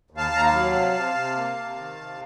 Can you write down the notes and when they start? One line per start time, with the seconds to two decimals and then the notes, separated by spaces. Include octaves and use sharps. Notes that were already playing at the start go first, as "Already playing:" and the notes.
0.11 D#2
0.17 F5 A5
0.32 D#2 A#5
0.45 F5 A5
0.52 F#3
0.73 C3
0.94 C3
1.15 C3
1.36 A#3
1.57 C3
1.77 D#3
1.98 C3